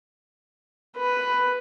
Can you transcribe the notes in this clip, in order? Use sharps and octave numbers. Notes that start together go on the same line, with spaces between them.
B4